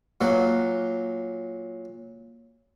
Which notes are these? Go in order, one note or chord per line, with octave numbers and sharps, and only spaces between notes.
A#2 F#3